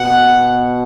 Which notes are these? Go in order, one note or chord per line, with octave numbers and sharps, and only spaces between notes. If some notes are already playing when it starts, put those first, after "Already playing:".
Already playing: B2 F#5